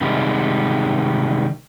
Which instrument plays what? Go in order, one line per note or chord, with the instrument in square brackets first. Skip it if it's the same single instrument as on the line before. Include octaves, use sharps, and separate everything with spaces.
[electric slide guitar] C3 D#3 G3 G#3